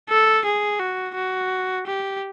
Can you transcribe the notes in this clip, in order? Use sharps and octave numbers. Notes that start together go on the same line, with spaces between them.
A4
G#4
F#4
F#4
G4